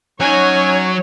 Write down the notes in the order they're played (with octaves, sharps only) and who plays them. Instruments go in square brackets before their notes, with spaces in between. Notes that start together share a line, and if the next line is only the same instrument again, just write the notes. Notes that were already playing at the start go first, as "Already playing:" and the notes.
[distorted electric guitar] F#3 [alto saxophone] C#4 [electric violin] D#4 G#5 [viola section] C#5